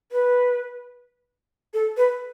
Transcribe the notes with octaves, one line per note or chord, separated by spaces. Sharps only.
B4
A4
B4